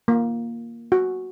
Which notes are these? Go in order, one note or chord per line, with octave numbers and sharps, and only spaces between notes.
A#3
F#4